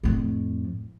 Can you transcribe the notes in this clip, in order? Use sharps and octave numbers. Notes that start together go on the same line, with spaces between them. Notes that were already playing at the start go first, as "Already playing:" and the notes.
F2 A2